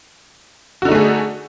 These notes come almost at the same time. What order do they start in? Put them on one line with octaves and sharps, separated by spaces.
F#4 D3 D#4 A3 G#4